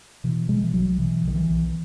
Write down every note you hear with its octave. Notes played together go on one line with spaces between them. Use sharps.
B2 E3
B2 G#3
E3
B1 F#3
B2 E3
B1 D#3
E3
B1